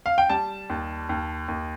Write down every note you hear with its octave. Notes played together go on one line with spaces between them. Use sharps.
F5
G5
G3 A5
D#2
D#2
D#2